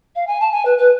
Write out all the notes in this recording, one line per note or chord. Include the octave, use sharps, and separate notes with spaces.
F5
G#5
A5
G#5
B4
B4